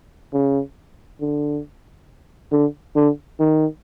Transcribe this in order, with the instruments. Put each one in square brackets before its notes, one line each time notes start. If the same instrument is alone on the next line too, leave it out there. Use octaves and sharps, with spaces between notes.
[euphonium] C#3
D3
D3
D3
D#3